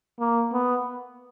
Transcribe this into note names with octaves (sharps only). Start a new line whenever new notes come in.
A#3
B3